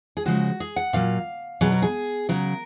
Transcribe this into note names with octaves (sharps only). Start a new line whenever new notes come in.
G#4
C#3 F3 G#3 F#4
G#4
F#5
A#2 F#3 F5
B2 F#3 G#4
A#4
G#4
C#3 F#3 A#4